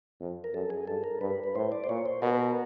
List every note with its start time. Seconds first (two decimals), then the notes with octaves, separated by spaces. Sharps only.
0.20 F2
0.44 A#4
0.54 F#2 A4
0.70 G#4
0.87 G2 A4
1.04 A#4
1.21 G2 B4
1.44 B4
1.55 A2 C5
1.72 D5
1.84 C5
1.89 A#2 C#5
2.06 C5
2.22 B2 A#4
2.31 B4
2.39 A#4